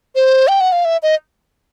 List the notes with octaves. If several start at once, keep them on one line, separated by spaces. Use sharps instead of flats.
C5
G5
F#5
F5
E5
D#5